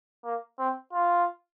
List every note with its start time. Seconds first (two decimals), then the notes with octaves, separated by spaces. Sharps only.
0.25 A#3
0.59 C4
0.93 F4